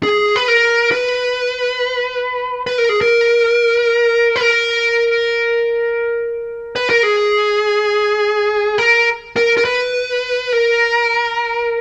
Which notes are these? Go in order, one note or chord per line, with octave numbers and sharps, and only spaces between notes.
G#4
B4
A#4
B4
B4
A#4
G#4
A#4
B4
A#4
B4
A#4
G#4
A#4
A#4
A#4
B4
A#4